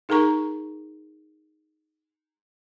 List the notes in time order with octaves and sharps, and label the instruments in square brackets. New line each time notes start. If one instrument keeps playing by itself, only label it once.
[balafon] D#4 G#4 A#4 A#5 C#6